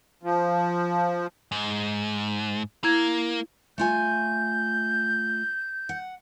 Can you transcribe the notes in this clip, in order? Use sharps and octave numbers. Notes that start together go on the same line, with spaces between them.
F3
G#2
A#3 E4 G#6
A3 F4 G#5 G6
F#5